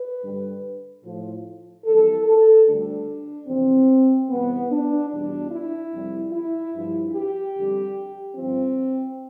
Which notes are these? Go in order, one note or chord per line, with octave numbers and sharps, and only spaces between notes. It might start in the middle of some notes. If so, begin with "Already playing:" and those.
Already playing: B4
G2 D3 G3
A2 F3
F2 E3 G3 A4
A4
D2 D3 G3 D4
E2 C3 F3 C4
E2 C3 G3 B3
D4
E2 B2 G3 D4
E4
F2 C3 G3
E4
G2 F3
G4
F2 D3 G3
G2 D3 F3 C4